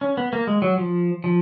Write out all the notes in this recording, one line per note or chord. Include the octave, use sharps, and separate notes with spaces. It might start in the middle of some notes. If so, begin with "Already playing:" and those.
C#4
B3
A#3
G#3
F#3
F3
F3